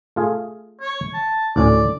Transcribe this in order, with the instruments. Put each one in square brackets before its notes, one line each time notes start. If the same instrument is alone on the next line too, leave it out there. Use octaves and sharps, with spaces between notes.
[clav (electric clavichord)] A3 F4 G#4
[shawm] C#5
A5
[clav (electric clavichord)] D2 A2 C#4 [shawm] D5